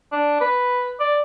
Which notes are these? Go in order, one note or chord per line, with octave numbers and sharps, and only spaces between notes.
D4
B4
D5